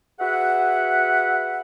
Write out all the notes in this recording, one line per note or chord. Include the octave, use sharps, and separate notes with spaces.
F#4 G#4 B4 E5 F#5